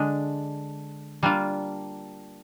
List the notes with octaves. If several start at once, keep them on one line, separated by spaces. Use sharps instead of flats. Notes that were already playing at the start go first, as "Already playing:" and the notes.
Already playing: D3 G#3 D4
G3 A#3 D4 F4